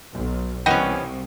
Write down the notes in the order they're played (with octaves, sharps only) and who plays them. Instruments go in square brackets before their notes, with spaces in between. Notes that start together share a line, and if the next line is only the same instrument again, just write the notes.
[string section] B1
[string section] C2 [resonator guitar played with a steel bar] E3 B3 C#4 [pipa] D#5 F#5 G5